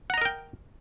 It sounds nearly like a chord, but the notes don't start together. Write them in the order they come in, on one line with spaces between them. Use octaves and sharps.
F#5 A#5 D#5 A#4 G5